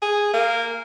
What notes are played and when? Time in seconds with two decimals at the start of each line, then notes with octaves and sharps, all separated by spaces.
0.02 G#4
0.34 A#3